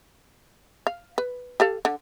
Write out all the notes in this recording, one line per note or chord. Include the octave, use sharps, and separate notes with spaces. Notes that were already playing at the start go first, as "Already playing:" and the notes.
F5
B4
G4 A4 F5
D3